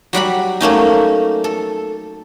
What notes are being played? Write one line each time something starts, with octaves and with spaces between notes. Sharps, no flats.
F#3 G3 F#5 B5
A3 A#3 C#4 D#4
A4